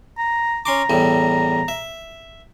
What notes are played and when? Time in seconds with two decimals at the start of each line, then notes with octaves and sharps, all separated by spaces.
0.18 A#5
0.65 C#4 A#5 C6 D6
0.90 E2 A2 G3
1.68 E5